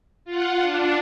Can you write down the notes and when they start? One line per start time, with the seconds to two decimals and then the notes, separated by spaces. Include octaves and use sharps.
0.25 F4 F#5
0.60 D4